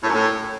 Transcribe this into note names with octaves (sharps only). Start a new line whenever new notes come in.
A2
F#2
A2